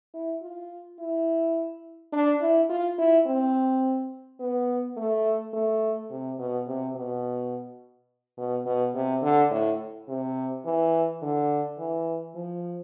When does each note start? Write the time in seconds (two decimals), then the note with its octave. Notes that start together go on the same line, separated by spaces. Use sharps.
0.14 E4
0.42 F4
0.99 E4
2.13 D4
2.41 E4
2.70 F4
2.98 E4
3.26 C4
4.40 B3
4.97 A3
5.53 A3
6.10 C3
6.39 B2
6.67 C3
6.95 B2
8.37 B2
8.66 B2
8.94 C3
9.22 D3
9.51 A2
10.08 C3
10.65 E3
11.22 D3
11.78 E3
12.35 F3